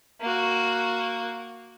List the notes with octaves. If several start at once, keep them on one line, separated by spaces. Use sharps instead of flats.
A#3 F#4